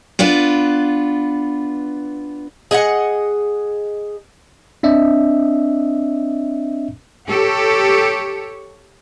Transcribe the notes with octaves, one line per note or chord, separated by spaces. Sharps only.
B3 D4 F4 B4
G#4 D#5 F5 F#5
C4 D4 D#5 E5
G4 A4 C#5